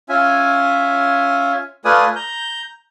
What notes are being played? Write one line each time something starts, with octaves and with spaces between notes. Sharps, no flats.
C#4 F4 E5 G#5
A3 F4 B4 D5 G#5 D#6
A#5 G6